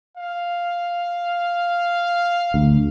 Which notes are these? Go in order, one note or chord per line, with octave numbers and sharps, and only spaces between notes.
F5
D2